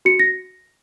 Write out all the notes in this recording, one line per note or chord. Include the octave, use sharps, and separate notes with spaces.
F#4 C#7
A#6